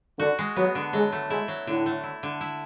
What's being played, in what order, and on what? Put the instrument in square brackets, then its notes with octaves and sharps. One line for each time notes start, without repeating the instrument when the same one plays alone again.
[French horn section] D3 [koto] F#4
[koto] G#3
[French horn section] F#3 [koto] B3
[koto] D3
[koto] F#3 [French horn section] G#3
[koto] A3
[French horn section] G#3 [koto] E4
[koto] F#3
[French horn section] A2 [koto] D3
[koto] A3
E4
D3
E4